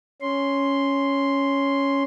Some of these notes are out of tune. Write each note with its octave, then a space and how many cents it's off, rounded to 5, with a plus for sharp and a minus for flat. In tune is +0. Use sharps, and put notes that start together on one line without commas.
C#4 +0 C6 +0